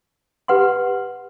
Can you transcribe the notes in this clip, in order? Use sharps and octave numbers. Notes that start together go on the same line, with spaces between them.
G4 B4 F#5 C6